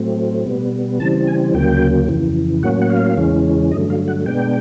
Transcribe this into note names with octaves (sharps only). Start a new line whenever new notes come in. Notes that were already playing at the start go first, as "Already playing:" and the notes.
Already playing: A2 F#3 A3 C4
B2 G3 B3
C#3 E3 G3 C4 A5
G#5
D2 C#3 F#3 A#3 G5
F2 C#3 E3
A2 F#3 A#3 C#4 F#5
F#5
F5
E2 C#3 E3 G#3 C#4
G2 D3 F#3 A3 D#5
F5
F#5
B2 G#3 B3 D4 G5